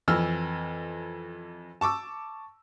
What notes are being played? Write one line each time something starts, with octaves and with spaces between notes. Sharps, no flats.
F2 E3 E6 F6
A5 C#6 D6 E6